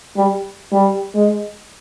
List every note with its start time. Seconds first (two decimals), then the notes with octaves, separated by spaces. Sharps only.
0.17 G3
0.72 G3
1.15 G#3